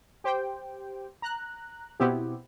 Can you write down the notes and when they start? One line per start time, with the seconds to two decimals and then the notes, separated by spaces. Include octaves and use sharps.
0.24 G4 C5 G5
1.22 A#5 F#6
2.00 B2 B3 C4 E4 G4